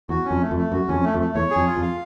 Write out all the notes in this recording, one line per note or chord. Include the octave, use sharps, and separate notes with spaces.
E2 F#4
C#4
F2
A3
F2
A3
F#2 F#4
E2 F2 C#4
A3
F2
A3
E2 C#5
G#4
F2
F4
F2
F5